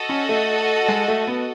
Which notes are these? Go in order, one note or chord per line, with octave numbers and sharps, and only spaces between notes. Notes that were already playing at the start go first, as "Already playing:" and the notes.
Already playing: F#4 A4 D#5
C#4
A3
G#3
A3
B3